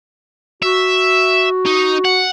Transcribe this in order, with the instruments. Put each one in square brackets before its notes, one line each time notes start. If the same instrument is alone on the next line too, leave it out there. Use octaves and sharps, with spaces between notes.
[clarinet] F#4 [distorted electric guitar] E5
[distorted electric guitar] D#4
F#5